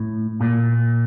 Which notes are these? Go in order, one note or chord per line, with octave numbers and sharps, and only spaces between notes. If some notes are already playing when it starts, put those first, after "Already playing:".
Already playing: A2
A#2